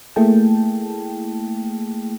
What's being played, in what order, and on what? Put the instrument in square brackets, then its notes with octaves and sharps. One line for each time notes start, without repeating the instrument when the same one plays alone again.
[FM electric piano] A3 A#3 E4 G#4 G5 A5